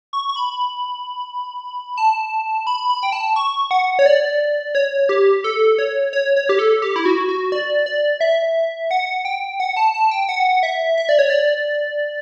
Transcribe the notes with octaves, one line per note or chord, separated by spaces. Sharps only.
C#6
C#6
B5
A5
B5
B5
G5
A5
C#6
F#5
C#5
D5
C#5
G4
A4
C#5
C#5
C#5
G4
A4
G4
E4
F#4
F#4
D5
D5
E5
F#5
G5
F#5
A5
A5
G5
F#5
E5
E5
D5
C#5
D5